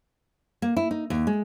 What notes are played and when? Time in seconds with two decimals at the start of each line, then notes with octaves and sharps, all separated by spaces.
0.62 A#3
0.77 E4
0.91 D#4
1.10 D#2
1.27 G#3